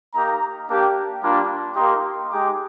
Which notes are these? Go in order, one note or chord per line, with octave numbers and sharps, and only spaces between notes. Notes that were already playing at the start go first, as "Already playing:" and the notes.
A#3 D#4 G4 A#5
A#3 D4 G4
G3 A#3 D4 F4
A#3 D#4 G4 C6
G#3 D#4 G4 D6